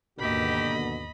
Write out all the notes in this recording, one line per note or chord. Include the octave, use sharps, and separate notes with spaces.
G#1 D#2 B2 D3 A#3 G4 D#5 B5